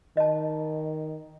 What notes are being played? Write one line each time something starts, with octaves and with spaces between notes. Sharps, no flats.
D#3 D#5 A5